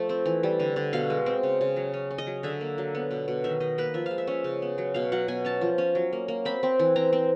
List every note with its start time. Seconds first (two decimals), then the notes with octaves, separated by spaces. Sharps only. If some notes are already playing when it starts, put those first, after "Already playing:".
Already playing: F3 A3
0.09 C4
0.26 E3
0.43 G3
0.60 D3
0.76 D3
0.93 B2 F5
1.10 G#3
1.26 C4
1.43 C#3
1.61 C#3
1.76 F#3
1.94 C#4
2.11 C#4
2.18 D#5
2.27 F#3
2.43 D3 E5
2.61 A#3
2.78 F#3
2.95 B3
3.11 B2
3.28 B2
3.44 D#3 E5
3.60 D#3 D#5
3.78 A#3 B4
3.94 F3 E5
4.06 G#3 F5
4.18 E5
4.27 C#4
4.44 C#3
4.62 B3
4.78 F#3
4.94 B2 F5
5.12 F#3 F#5
5.28 B2 G#5
5.45 C#4 A5
5.61 F3
5.78 C#4
5.95 F#3
6.13 A#3
6.28 A#3
6.45 C4 B5
6.63 C4
6.79 E3
6.96 C4 A#5
7.13 C4